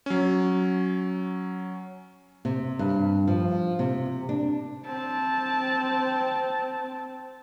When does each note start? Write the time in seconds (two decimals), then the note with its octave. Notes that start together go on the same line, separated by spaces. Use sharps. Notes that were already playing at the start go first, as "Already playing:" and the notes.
0.06 F#3 C#4
2.45 C3
2.79 G2
3.28 F3
3.79 C3
4.29 D4
4.85 C4 A5